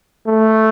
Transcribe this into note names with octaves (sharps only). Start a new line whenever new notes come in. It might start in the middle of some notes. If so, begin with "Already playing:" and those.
A3